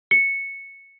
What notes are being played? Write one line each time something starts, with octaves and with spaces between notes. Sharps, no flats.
C#7